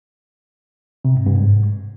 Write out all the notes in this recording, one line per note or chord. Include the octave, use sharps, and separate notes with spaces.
C3
G#2
G2
G#2